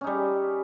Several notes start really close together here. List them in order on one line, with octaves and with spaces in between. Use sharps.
C#4 D#4 G3